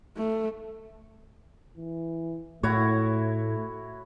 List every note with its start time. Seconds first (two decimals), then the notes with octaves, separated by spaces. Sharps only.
0.17 A3
1.77 E3
2.63 A2 A3 E4 F#4 C#5